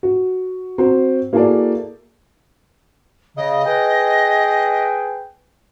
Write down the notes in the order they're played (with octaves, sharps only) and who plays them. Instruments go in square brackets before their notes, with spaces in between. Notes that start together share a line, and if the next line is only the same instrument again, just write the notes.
[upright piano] F#4
C4 F#4 C5
A#3 E4 F#4 G#4 A4 D5
[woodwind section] C#3 [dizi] D#5
[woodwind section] G#4 B4 G5